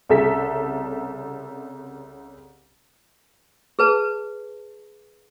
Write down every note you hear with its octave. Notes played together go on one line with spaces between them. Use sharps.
C2 C#3 A4 E5 B6
G#4 B4 A5